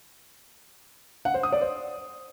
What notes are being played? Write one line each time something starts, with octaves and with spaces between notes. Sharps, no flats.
F#5
C5
D#6
D5
C5